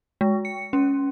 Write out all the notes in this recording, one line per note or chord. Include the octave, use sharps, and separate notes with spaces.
G#3
C#7
C#4